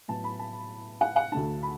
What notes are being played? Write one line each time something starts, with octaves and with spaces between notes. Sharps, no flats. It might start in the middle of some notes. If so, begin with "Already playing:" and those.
A2 F#3 B3 A5
B5
A5
F#5
F#5
D2 D3 A3 D4 A5
B5